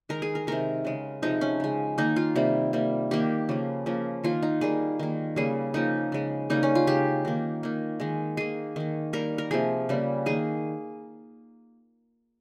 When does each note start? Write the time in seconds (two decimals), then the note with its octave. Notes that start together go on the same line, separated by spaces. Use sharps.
0.09 D#3 G#3 A#4
0.22 G#4
0.35 A#4
0.47 C3 D#3 G#3 A#4
0.85 C#3 G#3
1.22 C3 F3 G#3 D#4
1.41 C#4
1.60 C#3 G#3
1.98 D#3 A#3 D#4
2.16 F4
2.36 C3 G3 A#3
2.73 C3 G3 A#3
3.11 D#3 A#3 G4
3.49 C#3 F3 A#3
3.86 C#3 F3 A#3
4.24 D#3 A#3 F4
4.43 D#4
4.61 D#3 G3 A#3 G#4
4.99 D#3 A#3
5.36 C#3 G3 A#3 G#4
5.74 C#3 F3 A#3 D#4
6.12 C#3 G#3
6.50 C#3 G3 A#3 D#4
6.63 C#4
6.75 F4
6.87 C#3 G#3 G4
7.25 D#3 A#3
7.63 D#3 A#3
8.00 D#3 G#3
8.37 D#3 A#3 G#4
8.76 D#3 A#3
9.13 D#3 G3 A#3 A#4
9.38 A#4
9.51 C3 F3 A#3 G#4
9.89 C#3 G3 A#3
10.26 D#3 A#3 G#4